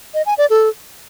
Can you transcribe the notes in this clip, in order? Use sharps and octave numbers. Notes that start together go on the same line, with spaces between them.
D#5
G#5
D5
A4